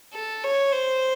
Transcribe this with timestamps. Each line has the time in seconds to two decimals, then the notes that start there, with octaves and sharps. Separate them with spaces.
0.14 A4
0.44 C#5
0.72 C5